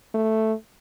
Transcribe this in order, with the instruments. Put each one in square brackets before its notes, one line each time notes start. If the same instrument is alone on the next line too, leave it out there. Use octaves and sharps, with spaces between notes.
[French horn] A3